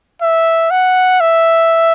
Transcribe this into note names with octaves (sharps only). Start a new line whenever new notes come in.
E5
F#5
E5